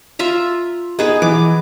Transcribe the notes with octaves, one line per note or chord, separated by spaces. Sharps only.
F4 E5 A#5
B3 D#4 G#4 B4
E3 D6